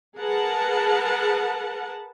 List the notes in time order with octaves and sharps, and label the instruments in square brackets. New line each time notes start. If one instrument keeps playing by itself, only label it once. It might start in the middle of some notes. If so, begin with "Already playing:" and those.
[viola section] G#4 A#4 B4 F#5 A5